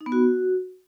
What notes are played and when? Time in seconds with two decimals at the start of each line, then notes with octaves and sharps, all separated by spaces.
0.01 D#4
0.06 B3
0.12 F#4